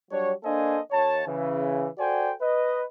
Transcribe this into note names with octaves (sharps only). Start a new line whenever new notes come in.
F#3 G3 D4 C#5
A#3 D4 A4 C5 D#5 G#5
D#2 C#5 A5
C#3 E3
F#4 A4 C5 D5 G5 G#5
B4 D#5